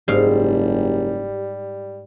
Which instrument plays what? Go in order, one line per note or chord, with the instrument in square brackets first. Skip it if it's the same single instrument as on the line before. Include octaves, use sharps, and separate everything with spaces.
[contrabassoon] F#1 [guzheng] G#2 F5 [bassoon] G3 [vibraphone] G4